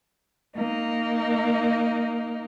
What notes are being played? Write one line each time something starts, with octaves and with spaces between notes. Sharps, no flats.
A#3 D#4